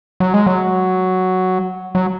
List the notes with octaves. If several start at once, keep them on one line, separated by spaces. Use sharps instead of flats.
F#3
G#3
F#3
F#3